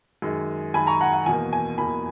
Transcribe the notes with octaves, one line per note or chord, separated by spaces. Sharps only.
F#2 D#3 G#3
F#2 D#3 G#3 G#5 B5
A#5 C#6
F#5 A#5
F#5
E2 B2 A#3 G#5
G#5
E2 B2 A#3 G#5 B5